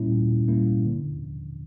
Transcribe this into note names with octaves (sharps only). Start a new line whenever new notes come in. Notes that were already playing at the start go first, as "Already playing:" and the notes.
Already playing: A#2 G3 A#3 C#4 E4
A#2
G3 A#3 C#4 E4
D3